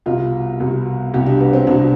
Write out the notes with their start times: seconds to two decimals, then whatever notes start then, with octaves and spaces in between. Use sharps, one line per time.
0.06 C2 B2 F4
0.60 C2 B2
1.14 C2 B2 G4
1.26 D4
1.40 B3
1.53 C4
1.67 C2 B2 D4